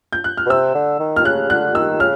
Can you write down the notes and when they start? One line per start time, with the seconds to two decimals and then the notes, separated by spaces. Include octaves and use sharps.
0.13 G6
0.24 F#6
0.37 F6
0.46 B2
0.50 C3 E6
0.75 D3
1.00 D#3
1.16 F6
1.25 C#3 F#6
1.50 D3 F#6
1.75 D#3 E6
2.00 C#3 F6